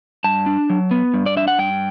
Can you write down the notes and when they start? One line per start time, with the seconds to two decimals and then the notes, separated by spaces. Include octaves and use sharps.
0.24 G2 A5
0.46 D4
0.70 F#3
0.91 B3
1.14 G2
1.26 D5
1.37 D4 E5
1.48 F#5
1.58 G2 G5